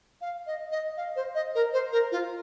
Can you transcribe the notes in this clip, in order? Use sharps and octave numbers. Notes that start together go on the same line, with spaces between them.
F5
D#5
D#5
F5
C5
D#5
A#4
C5
A#4
F4